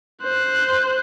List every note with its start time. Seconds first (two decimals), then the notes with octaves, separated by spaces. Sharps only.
0.23 C5 F#6